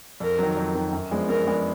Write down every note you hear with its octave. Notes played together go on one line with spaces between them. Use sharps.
F2 A#4
D#3 F#3
F2
D#3 F#3
F#2
F3 G#3 B3 D4
F#2 A#4
F3 G#3 B3 D4